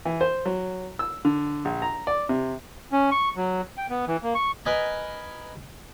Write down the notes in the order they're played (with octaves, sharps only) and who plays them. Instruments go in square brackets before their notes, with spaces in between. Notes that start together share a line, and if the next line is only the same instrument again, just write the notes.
[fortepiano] E3
C5
F#3
E6
D3
A#1
A#5
D5
C3
[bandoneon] C#4
C#6
F#3
G5
B3
E3
A#3
C#6
[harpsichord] A#4 B4 D#5 G#5 A#5